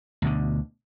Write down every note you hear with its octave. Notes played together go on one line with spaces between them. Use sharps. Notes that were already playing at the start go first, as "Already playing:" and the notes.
D2 B2 D3